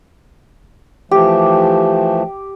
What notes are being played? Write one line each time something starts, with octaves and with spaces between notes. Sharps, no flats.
E3 F3 A3 G4